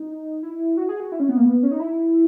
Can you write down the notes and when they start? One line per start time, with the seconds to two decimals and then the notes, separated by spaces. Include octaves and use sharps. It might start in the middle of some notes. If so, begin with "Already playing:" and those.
Already playing: D#4
0.43 E4
0.77 F#4
0.89 G#4
1.00 F#4
1.12 E4
1.20 C#4
1.29 B3
1.38 A#3
1.45 B3
1.63 C#4
1.71 D#4
1.80 E4